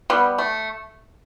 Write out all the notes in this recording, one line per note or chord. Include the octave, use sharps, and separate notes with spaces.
G3 B3
A3